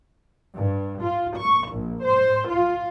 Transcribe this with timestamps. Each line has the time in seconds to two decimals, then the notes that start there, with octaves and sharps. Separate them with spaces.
0.54 G2
1.01 F4
1.35 C#6
1.69 A#1
2.02 C5
2.48 F4